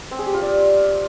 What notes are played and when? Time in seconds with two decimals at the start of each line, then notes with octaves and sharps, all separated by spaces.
0.11 C4
0.19 G#4
0.26 G4
0.34 F4
0.41 D5